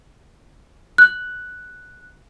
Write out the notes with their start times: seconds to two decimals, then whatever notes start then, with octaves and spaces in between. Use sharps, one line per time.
0.98 F#6